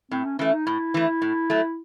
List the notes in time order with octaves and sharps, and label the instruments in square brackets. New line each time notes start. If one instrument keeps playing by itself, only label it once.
[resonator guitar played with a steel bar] A2 [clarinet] C4
[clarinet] C#4
[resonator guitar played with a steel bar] E3 A3 [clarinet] C#4
[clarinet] D#4
[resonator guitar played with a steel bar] A2 [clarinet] E4
[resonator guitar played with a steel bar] E3 A3
A2
F#3 A3